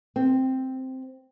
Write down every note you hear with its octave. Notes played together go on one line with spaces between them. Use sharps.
C4